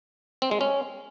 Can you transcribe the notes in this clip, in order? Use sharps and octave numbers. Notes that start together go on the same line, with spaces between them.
C4
G#3
C#4